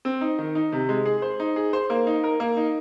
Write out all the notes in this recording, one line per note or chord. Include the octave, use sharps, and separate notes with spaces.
C4
D#4
D#3
D#4
C3
G#3
G#4
C5
D#4
G#4
C5
A#3
D#4
A#4
A#3
D#4